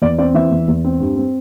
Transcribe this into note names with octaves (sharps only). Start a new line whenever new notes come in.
E2 D5
C4 D5
E3 E5
E2
E2
C4
G2
C4